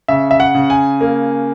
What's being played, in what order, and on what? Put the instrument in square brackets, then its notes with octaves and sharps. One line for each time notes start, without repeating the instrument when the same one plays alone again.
[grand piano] C#3 E5
E5
F#5
C#3
G#5
A#3